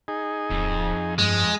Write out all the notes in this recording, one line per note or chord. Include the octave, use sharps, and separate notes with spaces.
D#4 G#4
D1 F2
G2 G#3